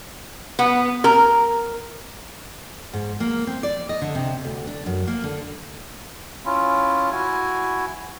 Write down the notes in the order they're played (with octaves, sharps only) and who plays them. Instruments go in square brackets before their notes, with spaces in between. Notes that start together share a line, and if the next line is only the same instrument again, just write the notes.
[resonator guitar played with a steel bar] B3
A#4
[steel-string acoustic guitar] G#2
A#3
C4
D5
D#5
D3
C3
D2
D4
F#2
A#3
D3
[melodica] C#4 E4 F4
E4 F#4 G#5